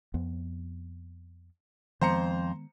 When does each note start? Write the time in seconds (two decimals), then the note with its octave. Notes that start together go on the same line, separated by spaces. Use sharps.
0.14 F2 F3 B3
2.01 F2 D#3 G#3 B3 C5 A#5 C#7